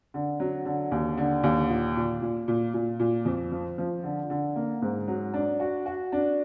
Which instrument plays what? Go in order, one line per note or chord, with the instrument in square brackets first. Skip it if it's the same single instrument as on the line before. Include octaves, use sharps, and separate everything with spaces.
[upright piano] D3
F#3
D3
D#2
D3
D#2
A#2
A#2
A#2
A#2
A#2
A#2
F2
F3
F3
D3
D3
A#3
G#2
F#3
D4
F#4
F#4
D4